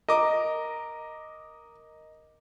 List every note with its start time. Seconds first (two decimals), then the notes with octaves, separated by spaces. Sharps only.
0.09 A#4 D#5 D6